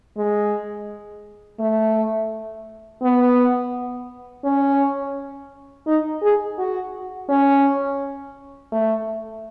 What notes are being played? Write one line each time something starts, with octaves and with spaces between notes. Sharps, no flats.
G#3
A3
B3
C#4
D#4
G#4
F#4
C#4
A3